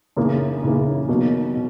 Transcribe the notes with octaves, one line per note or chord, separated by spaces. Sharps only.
F#2 C#3 E3 A#3
F#2 C#3 E3 A#3
B2 F#3 A#3
B2